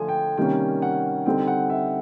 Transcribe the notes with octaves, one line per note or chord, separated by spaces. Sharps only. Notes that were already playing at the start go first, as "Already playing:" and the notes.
Already playing: D3 F3 A3 G#5
G5
C3 D#3 G3 A#3 C#4 G5
F#5
D3 G3 C4 D#4 G5
F#5
E5